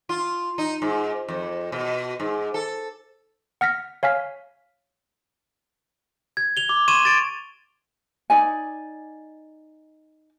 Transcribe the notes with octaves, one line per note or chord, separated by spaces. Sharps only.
F4
D#4
G#2
F2
B2
G#2
A4
F#5 F6 A#6 B6
C#5 F5 G#5 F6 B6
G#6
F7 G7
D6
C6 C#6 G#6 D#7 E7
A6 D7
D#4 D5 G#5